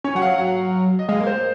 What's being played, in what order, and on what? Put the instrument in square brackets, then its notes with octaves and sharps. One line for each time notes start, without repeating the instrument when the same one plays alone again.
[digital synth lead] C#4 [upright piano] C#5
[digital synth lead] F#3 [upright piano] F#5
[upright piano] F5
[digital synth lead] F#3
[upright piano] F#5
D#5
[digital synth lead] G#3 [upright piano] F5
[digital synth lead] A#3
[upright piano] C5